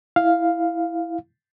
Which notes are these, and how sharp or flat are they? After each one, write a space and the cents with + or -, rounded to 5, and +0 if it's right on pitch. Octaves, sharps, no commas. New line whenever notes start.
E4 +0 F5 +0